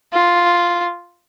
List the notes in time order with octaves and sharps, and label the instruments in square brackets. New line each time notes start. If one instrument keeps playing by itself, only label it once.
[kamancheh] F4